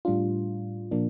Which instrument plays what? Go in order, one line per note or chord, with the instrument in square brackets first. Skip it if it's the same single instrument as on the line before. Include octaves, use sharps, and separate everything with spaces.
[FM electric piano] A2 G3 D4 F4
A#2 F3 A#3 D4